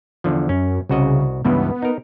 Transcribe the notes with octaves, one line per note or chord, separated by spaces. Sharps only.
E2 D3 F3
F#2 C#4
C2 C#3 F#4 D#5
C#2 G2 E3 B3
D#4 A#4